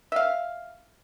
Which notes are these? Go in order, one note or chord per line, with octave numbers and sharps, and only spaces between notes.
E5 F5